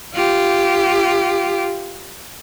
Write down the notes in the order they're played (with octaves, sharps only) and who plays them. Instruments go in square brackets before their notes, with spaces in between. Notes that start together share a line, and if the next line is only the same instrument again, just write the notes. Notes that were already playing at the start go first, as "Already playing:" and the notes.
[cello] F4 G4